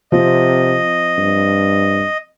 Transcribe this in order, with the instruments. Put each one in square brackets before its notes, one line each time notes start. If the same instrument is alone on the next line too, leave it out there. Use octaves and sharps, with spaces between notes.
[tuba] C3 [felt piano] F3 C4 [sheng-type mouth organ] D#5
[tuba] G2